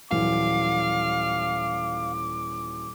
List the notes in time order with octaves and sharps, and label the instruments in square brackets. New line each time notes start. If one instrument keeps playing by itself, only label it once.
[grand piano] D#1 E3 F#3 [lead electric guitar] F5 [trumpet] D6